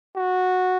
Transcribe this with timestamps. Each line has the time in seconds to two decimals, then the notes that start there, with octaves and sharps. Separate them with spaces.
0.16 F#4